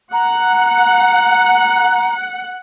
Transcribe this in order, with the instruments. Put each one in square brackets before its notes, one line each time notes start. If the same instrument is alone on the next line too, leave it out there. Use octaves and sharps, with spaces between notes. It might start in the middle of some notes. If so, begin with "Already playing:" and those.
[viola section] F#5 [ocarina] A#5